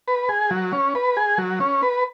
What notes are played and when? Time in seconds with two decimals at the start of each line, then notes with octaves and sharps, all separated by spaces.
0.08 B4
0.29 G#4
0.51 F#3
0.72 C#4
0.95 B4
1.17 G#4
1.38 F#3
1.60 C#4
1.83 B4